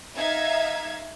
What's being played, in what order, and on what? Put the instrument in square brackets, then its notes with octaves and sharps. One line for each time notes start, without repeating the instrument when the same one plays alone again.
[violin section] D#4 E5 F5 G#6